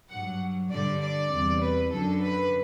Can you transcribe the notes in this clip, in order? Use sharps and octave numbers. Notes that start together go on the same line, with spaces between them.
G2 F#3 F#5
G2 D3 G3 D5
D5
E2 C3 G3
B4
F#2 D3 F#3 A4
B4